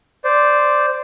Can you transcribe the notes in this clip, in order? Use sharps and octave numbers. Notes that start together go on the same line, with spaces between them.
C5 D5